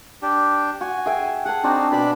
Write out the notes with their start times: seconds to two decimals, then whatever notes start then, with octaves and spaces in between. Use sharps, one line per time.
0.22 D4 G4
0.81 F#4 G#5
1.06 G#4 E5 G5
1.45 G#4 F#5 A5
1.64 C4 D4 D#4 F#4 D5
1.92 B2 D4 D5 B5